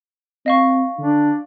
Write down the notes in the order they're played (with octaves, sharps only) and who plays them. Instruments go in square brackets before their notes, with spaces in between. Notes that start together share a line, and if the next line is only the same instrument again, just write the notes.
[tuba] C4 [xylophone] D#5 F5 C#6
[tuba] D3 [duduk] D4